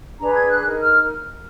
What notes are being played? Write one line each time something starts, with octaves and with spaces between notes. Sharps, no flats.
D4 G#4 B4 A#5
G#6
F#6
D#4 A#4
F6